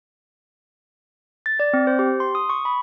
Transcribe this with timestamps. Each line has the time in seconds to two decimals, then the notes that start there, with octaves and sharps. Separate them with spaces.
1.46 A6
1.60 D5
1.73 C4
1.87 C5
1.99 G4
2.20 C6
2.35 D#6
2.50 C#6
2.65 B5